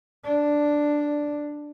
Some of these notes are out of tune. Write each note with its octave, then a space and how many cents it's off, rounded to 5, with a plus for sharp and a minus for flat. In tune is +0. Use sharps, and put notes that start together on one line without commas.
D4 +0